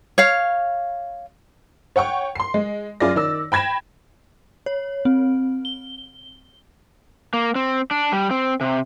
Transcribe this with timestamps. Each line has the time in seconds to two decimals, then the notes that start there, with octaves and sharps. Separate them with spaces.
0.18 C#5 F5
1.96 C#5 F#5 G5 C#6
2.35 C6 C7
2.54 G#3
3.00 F#2 F4 G#4 D5 A#6
3.15 D#3 D5 E6
3.52 G5 B5 G#6 A#6 E7
4.66 C#5
5.05 C4
5.65 G7
7.33 A#3
7.55 C4
7.91 D4
8.12 G3
8.31 C4
8.61 C3